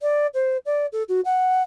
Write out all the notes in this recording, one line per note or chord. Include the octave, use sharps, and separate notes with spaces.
D5
C5
D5
A4
F#4
F#5